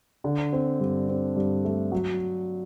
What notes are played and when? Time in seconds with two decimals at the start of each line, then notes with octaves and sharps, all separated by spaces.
0.24 D3
0.53 C4
0.80 G2
1.09 C4
1.36 G2
1.65 A3
1.92 F#3